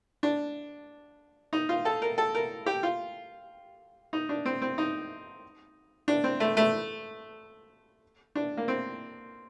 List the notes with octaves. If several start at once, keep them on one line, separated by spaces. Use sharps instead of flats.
D4
D#4
F4
A4
A#4
A4
A#4
G4
F4
D#4
D4
C4
C4
D#4
D4
C4
A3
A3
D4
A#3
C4